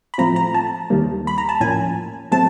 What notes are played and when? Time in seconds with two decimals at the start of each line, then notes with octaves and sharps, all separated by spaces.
0.14 B5
0.18 A2 F3 A3 C4 F4 A#5
0.36 A#5
0.54 A5
0.90 D#2 D#3 G3 A#3
1.27 B5
1.38 A#5
1.49 A5
1.60 A2 F3 A#3 C#4 G#5
2.32 A2 F#3 A3 C4 A5